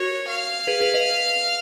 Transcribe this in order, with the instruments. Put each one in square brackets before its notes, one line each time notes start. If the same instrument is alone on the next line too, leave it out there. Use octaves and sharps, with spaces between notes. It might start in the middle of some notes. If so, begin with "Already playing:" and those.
Already playing: [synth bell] F#4 A#4 [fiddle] C#5
[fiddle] F5
[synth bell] G#4 B4
G#4 B4
B4 D#5